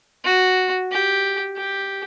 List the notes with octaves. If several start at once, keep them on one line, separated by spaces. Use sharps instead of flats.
F#4
G4
G4